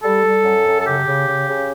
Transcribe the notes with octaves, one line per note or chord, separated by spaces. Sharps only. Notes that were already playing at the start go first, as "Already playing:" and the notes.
G3 A4
G3
F#2
F#2
A4
C#3 G4
C#3
C#3
C#3